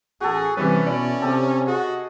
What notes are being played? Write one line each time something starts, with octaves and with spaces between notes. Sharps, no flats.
A1 F#4 G#4 A4
C3 E3 G3 C#4 B4
B2 E4 D5
C3 G4 A4
F#4 G#4 D#5